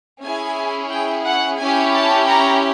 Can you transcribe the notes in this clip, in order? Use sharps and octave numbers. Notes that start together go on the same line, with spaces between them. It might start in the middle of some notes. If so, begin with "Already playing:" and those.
C#4 E4 G#4 G#5
G5
F#5
C#4 E4 G4 G#5
A5
A#5